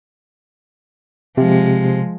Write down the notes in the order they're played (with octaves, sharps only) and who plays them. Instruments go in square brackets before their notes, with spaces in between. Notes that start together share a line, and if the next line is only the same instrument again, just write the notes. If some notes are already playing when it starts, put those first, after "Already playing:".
[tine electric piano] C3 [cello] F3 G#3